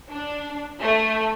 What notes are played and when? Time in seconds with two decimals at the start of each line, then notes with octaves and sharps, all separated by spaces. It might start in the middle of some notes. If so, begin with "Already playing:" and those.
0.11 D4
0.82 A3